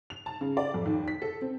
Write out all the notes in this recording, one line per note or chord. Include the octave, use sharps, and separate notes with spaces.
F7
A5
C#3
D5
F2
D#2
B6
A4
C4